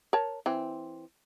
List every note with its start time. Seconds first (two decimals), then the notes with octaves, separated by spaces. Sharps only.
0.13 A#4 C#5 A5
0.46 E3 C4